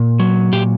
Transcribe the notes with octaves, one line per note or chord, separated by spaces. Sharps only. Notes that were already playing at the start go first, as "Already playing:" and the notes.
Already playing: A#2
F#3
A#2 G4